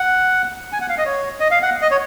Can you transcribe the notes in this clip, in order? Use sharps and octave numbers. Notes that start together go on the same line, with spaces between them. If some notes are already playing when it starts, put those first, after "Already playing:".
Already playing: F#5
G#5
F#5
F5
D#5
C#5
D#5
F5
F#5
D#5
C#5